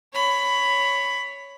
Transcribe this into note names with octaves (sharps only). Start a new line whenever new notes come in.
C#5 B5